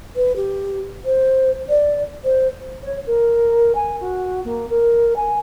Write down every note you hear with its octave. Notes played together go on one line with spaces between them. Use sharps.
B4
G4
C5
D5
C5
C#5
A#4
G#5
F#4
A#3
A#4
G#5